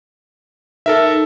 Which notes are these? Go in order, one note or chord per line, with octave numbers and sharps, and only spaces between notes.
D#4 A4 A#4 E5